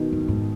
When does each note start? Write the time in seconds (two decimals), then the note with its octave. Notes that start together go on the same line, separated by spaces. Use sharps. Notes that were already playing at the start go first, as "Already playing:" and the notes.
Already playing: B2 D#3
0.13 G#2
0.21 F#2
0.28 G#2